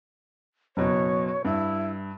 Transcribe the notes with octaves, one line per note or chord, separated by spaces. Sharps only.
F#1 B2 C#5
G2 E4